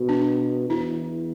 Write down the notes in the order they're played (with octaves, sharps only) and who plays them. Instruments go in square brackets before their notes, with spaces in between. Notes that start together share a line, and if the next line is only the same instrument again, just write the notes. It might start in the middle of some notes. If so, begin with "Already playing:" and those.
Already playing: [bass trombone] B2
[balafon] D4
[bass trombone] E2 [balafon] E4